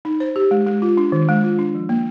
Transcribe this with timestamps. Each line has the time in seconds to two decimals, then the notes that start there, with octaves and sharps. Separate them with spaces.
0.05 D#4
0.20 C5
0.36 G4
0.51 G#3
0.66 G#3
0.82 F4
0.97 D4
1.12 D#3
1.28 G#3
1.44 F4
1.59 D4
1.75 F3
1.89 A#3